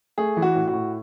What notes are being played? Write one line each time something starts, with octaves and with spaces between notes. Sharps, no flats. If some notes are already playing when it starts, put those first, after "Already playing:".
A3 G#4
E3
F#4
A2
F#4
A2